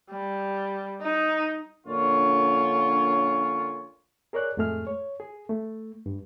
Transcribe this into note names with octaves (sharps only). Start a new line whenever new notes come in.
G3
D#4
A#1 A#2 D3 C#4 F4 C#5
G#4 A#4 C#5 D5 F#6
F2 A2 G#3 A3 G#4 F6
C#5
G#4
A3
G2